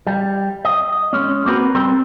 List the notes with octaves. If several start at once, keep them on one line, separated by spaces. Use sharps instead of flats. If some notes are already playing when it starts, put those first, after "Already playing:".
G3
D#5
G#3 C#4
A#3 C4 F#4 A#4 B4
G3 C4 A#4 C5